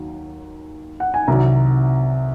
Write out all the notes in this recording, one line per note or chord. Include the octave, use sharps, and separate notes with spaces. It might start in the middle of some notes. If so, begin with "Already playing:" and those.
Already playing: D#2 D#3 F#3
F#5
G#5
C2 C3 D#3 F#3 A#5